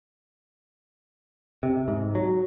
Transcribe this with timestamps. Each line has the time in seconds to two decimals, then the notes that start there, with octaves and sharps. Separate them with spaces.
1.63 C3
1.88 G#2
2.15 F#3